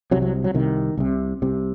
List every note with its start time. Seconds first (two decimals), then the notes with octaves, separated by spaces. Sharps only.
0.11 C3 F#3
0.16 C2
0.22 F#3
0.44 F#3
0.54 C2 C3 D#3
0.97 C2 C3
1.42 C2 C3